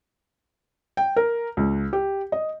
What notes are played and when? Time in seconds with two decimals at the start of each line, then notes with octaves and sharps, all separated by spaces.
0.97 G5
1.16 A#4
1.57 C#2
1.93 G4
2.32 D#5